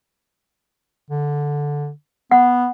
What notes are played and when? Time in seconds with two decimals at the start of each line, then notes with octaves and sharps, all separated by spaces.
1.10 D3
2.31 B3 F#5